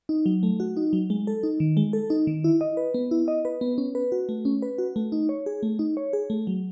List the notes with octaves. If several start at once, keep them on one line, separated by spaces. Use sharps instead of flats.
D#4
F#3
A3
F#4
D#4
F#3
G#3
A4
D#4
D#3
G#3
A4
D#4
D#3
E4
D#5
B4
B3
E4
D#5
B4
B3
C#4
B4
F#4
A3
C#4
B4
F#4
A3
D#4
C#5
G#4
A3
D#4
C#5
G#4
A3
F#3